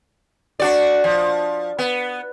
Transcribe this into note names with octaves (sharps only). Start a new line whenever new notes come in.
D4 F#4 D5
F3
B3